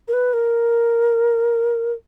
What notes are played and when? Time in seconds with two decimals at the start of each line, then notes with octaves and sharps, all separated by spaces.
0.08 A#4
0.13 B4
0.33 A#4